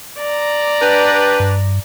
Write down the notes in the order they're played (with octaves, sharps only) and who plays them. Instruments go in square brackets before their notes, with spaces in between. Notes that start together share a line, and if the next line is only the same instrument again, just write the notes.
[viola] D5 A#5
[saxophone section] D4 G4 B4
[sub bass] G2